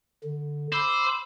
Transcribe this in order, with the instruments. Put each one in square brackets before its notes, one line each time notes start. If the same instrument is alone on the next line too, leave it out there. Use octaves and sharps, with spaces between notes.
[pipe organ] D3
[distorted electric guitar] C5 [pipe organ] B5 D6 E6